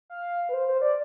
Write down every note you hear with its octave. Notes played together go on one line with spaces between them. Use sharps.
F5
B4
C5
C5
D5